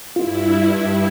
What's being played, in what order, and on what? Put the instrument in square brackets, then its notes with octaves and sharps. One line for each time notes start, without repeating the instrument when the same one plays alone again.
[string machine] G2 E4 [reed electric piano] F4